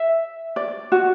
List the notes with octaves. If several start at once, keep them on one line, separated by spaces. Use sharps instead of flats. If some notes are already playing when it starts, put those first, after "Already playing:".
Already playing: E5
D5
F#4